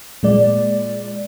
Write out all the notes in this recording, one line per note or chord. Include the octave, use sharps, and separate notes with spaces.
A#2 G#3 D5